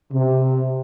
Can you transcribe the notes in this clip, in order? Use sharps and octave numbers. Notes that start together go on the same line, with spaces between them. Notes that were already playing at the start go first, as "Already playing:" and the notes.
C3